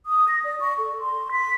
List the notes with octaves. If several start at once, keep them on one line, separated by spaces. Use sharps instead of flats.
D#6
A#6
D5
C#6
A4
C6
B6